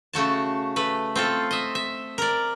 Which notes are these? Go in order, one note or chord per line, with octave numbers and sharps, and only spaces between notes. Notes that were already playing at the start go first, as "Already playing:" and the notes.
C#3 A3 F#4 A5
A3 B4
C4 F4 A4
D#5 E5
E5
A#4 D5